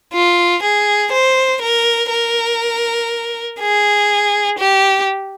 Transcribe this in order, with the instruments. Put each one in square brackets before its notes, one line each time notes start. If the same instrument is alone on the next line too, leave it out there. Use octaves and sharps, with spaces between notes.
[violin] F4
G#4
C5
A#4
A#4
G#4
G4